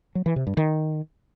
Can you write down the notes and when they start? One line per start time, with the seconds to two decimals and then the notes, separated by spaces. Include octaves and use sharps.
0.15 F#3
0.26 E3
0.36 C3
0.47 G2
0.57 D#3